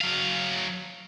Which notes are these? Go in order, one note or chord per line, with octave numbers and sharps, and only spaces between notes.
F#3 F5